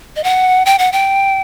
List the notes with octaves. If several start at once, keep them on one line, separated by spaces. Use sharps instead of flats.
D#5
F#5
G5
F#5
G5